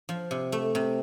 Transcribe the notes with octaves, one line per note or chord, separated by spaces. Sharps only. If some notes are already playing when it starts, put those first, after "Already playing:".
F3
C3
A3
C3